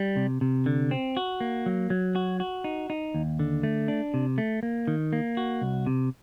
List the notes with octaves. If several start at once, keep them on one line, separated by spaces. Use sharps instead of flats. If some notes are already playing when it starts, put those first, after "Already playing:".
Already playing: G3
C3
C3
D3
C4
F#4
A#3
F#3
F#3
F#4
F#4
D#4
D#4
D#2
D3
A3
D4
C3
A3
A#3
D#3
A#3
F#4
C2
C3